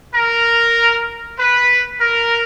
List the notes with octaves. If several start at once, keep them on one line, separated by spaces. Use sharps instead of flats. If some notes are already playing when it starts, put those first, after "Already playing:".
A#4
B4
A#4